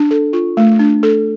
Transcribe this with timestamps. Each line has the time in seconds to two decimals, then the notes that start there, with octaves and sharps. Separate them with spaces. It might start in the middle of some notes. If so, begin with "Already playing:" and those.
Already playing: D4
0.11 A4
0.33 F4
0.57 A3
0.79 D4
1.03 A4